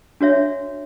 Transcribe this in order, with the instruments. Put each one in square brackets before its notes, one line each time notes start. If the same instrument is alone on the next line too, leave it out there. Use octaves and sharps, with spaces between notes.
[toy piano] D4 F#4 C#5 E5